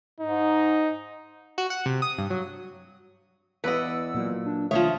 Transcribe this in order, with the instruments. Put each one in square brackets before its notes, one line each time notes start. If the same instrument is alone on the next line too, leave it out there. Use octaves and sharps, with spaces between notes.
[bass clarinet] G#2 [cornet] D#4
[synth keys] F#4
F#5
C3
D#6
G2
F#3
[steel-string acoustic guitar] E2 F#5 [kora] B4 D5 D#5 [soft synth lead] E6
[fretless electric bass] A#2 F#3
[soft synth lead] D4
[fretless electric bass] B1 D#3 A3 [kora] F3 F4 C#5 [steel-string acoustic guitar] E5 [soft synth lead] D#6